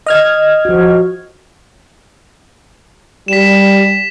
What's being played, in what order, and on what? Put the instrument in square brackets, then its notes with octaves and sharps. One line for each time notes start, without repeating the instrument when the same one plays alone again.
[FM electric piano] D#5 F6 G#6
[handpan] F3 F#4
[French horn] G3 [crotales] B6 E7